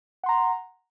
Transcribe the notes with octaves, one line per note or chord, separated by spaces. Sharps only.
F#5 A#5 C6